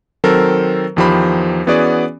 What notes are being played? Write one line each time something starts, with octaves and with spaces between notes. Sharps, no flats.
D#3 F#3 C4 A4 A#4 C5
E2 D#3 F3 G4 C5 B5
E3 B3 C#4 F#4 G#4 D5